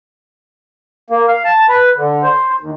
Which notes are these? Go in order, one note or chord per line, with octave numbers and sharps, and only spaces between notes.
A#3
F5
A5
B4
D3
C5
D#2